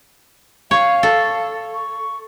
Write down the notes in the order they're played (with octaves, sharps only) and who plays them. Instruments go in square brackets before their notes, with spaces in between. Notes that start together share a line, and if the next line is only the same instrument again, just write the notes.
[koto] C#5 [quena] F5
[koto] A4
[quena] C#6